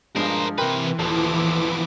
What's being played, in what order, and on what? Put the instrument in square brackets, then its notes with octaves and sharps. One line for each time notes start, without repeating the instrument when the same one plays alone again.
[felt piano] G2 F3 G#3 [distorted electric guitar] A#4 C5
[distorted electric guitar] C3 B4 [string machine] E3 [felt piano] A#4 G5 C6
[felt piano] D#1 [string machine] E3 E4 D6 [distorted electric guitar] F3 B3